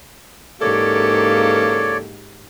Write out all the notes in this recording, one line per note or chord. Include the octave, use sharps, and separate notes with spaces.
G#2 C#3 E3 A#3 G4 A4 C#5 D5